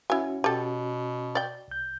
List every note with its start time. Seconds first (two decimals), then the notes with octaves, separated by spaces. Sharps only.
0.10 C#4 E4 F#4 G#5
0.44 B2 G4 A4
1.35 D5 G5
1.68 C2 G6